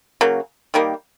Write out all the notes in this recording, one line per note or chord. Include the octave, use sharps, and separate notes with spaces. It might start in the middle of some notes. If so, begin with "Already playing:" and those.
C#3 F#3 A#3
D#3 G3 A#3